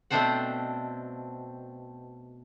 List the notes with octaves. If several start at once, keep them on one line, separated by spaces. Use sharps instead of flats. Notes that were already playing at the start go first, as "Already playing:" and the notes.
B2 A3 C4 D4 C5 F#5